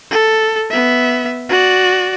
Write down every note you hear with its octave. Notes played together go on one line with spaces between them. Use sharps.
A4
B3 E5
F#4 D5